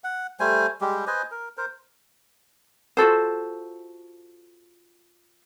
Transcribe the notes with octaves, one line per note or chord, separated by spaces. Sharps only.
F#5
G3 A3 C5 G#5
G3 G#3 G4
B4 C5 D#5 G#5
A#4
A#4 C5
F4 F#4 A4 C5